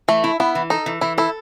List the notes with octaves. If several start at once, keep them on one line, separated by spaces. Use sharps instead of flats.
E3 A3
E4
B3 E4
E3
D#4 A4
E3
E3 E4
E4 A4